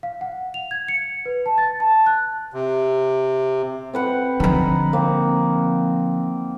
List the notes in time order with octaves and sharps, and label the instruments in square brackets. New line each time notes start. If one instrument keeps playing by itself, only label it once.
[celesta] F5
F#5
F7
G#6
C#7
B4
A5
A6
A5
F#6
[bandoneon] C3
[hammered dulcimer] C4 B4 F#5
[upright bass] D3 F3 [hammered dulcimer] D#4 B4
[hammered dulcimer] A#3 C4